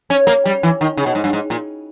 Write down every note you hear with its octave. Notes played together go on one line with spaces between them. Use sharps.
C#4
A#3
G3
E3
D#3
C#3
B2
G#2
G2
G#2
A#2